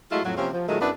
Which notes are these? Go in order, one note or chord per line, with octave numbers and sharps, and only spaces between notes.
F#3 G#3 A3 E4 F4
F2 A2 F#3
C3 F3 A#3 C4 C#4
F3
A#2 D#3 F#3 G#3 A3
F#2 B3 D4 E4 B4